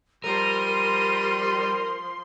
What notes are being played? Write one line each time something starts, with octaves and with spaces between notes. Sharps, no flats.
F3 G3 A#4 C6 D#7